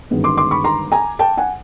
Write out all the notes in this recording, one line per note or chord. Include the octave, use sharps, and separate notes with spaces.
G1 F#2 D#3 G#3 B3
C6 D6
C6 D6
B5 C#6
A#5 C6
G#5 A#5
G5 A5
F#5 G#5